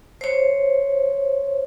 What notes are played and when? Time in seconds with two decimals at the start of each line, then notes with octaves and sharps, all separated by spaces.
0.21 C5 C#5